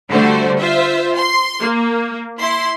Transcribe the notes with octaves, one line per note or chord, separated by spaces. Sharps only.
D3 G3 A3 F#4 C5
F4 C5 E5
C6
A#3
E4 C6